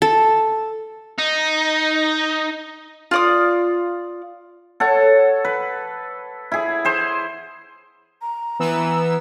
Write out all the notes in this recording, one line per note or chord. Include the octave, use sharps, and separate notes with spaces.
A4
D#4
F4 D5 D#6
A4 C#5 F#5
B4
E4 G#4
G#4 C5
A#5
E3 B3 E6